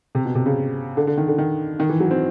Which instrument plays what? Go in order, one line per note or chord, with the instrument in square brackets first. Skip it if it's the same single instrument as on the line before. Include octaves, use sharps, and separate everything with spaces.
[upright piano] C3
B2
C3
C#3
D3
D3
D#3
D3
D#3
D#3
E3
F#3
C4